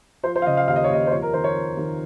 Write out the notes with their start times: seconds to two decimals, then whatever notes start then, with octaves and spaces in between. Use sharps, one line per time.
0.23 F3 C5
0.35 C5
0.42 F5
0.46 C#3 D#5
0.57 F5
0.67 D#2 F5
0.76 D#5
0.84 C#5
0.90 D#2 D#5
1.07 C5
1.11 F2 C#5
1.22 A#4
1.33 D#3 C5
1.44 C#5
1.55 F2
1.77 D#3